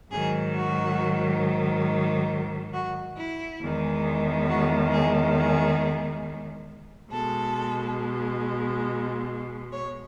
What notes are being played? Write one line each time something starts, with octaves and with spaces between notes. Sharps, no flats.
G#2 D#3 F#3 G#4
F#4
F#4
E4
E2 D#3 G#3
F#4
G#4
G#4
B2 G#3 A4
C#5